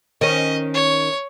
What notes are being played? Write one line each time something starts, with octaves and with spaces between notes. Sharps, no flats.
D#3 C#4 D#5
C#5